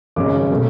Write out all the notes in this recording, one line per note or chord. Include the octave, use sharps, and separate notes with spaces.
G#1 F#2 C#3 G#3 C#4 D6
B2 F#3 A3